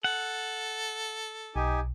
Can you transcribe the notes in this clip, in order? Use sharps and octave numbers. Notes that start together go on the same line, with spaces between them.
A4 F#5
B1 D#4 G4 G#5